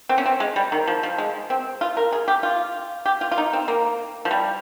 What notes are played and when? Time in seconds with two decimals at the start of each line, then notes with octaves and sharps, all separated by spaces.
0.09 C4
0.18 C#4
0.26 C4
0.40 G#3
0.56 G3
0.72 D#3
0.88 F3
1.03 F3
1.18 G#3
1.50 C4
1.81 F4
1.97 A#4
2.13 G#4
2.28 G4
2.43 F4
3.05 G4
3.21 F4
3.31 F4
3.38 D#4
3.53 C4
3.68 A#3
4.25 F3
4.31 G3